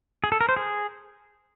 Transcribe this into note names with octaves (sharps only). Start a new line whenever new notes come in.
G#4
A4
A#4
C5
G#4